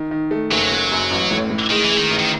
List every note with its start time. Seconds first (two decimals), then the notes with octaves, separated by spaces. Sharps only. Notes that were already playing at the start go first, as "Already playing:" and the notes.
Already playing: D#3
0.11 D#3
0.31 A3
0.51 F#1 F#3
0.71 F#1
0.91 F#2
1.10 A1
1.31 A2
1.50 A2
1.70 D#3 G#3
1.84 E3
1.91 G#3
1.98 D#3
2.11 A1
2.19 D#3